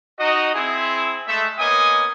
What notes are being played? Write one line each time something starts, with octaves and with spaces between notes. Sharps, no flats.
D#4 F#4 D#5
C4 E4 G#4
G#3 A3 E5
A#3 B3 C#4 D#5 G#5 D#6